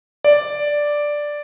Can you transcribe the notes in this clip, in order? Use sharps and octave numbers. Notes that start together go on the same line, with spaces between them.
D5